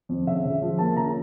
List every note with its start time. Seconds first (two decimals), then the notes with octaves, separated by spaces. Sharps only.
0.09 F2
0.26 C#3 E5
0.45 C#3
0.62 F3
0.79 A#3 A5
0.96 C#3 A#5